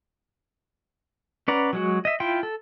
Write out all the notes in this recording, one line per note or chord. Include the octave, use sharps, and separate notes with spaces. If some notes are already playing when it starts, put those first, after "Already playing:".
C#4 B4 D5 F#5 A#5
F#3 G#3 F#4
D#5 E5
E4 F4 G5 C6
A4